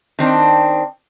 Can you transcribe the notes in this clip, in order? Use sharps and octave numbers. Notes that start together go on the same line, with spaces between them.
D#3 C4 D4